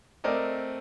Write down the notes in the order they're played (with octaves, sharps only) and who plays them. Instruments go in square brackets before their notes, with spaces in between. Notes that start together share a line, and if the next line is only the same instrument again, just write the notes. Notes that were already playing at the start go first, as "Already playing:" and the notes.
[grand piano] A3 C4 A#4 D5 D#5